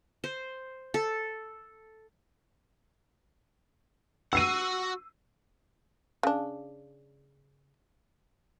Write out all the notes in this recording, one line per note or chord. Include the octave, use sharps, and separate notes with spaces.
C5
A4
F#4 F#5 E6 C7 D#7
C#3 D4